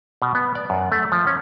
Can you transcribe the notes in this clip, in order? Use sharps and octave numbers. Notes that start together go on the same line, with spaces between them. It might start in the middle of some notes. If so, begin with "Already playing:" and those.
B2
B3
D5
F#2
A3
F3
C#4